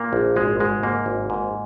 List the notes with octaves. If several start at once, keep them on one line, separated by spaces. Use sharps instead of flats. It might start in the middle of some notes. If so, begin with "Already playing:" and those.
Already playing: A#2 A#3
A#1
G#1 G#3
G#2 G#3
G#2 A#3
G#1
G#2